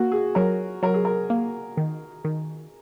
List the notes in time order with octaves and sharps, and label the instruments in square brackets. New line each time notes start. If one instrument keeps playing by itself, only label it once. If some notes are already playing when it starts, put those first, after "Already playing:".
Already playing: [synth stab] A#3 [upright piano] F#4
[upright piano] G#4
[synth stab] F#3 [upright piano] A#4
[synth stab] F#3 [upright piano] A#4
[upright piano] G#4
A#4
[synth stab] A#3
D#3
D#3